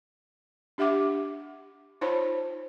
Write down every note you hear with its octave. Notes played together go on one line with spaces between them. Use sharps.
D4 G4 E5 F#5 D6
D#4 F4 C5 C#5 A5 B5